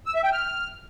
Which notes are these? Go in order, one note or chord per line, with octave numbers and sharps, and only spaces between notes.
E6
E5
G5
F6